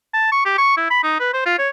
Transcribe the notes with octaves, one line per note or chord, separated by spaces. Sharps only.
A5
C#6
G4
C#6
E4
B5
D#4
B4
C5
F4
C#5